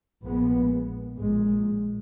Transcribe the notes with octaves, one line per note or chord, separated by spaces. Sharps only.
A#1 A#2 G#3 B3
A#1 A#2 G#3